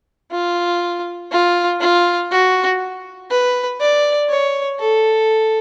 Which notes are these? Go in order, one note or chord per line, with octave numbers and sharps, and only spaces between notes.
F4
F4
F4
F#4
B4
D5
C#5
A4